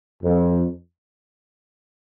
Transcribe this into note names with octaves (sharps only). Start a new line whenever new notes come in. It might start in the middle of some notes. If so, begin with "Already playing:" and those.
F2